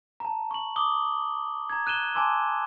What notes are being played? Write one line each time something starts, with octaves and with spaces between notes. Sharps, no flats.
A5 A#5
C#6 F#7
D6 D#6 G7
A#5 G#6
F#6 D#7 E7 G7
G#5 A5 C6 D6 E6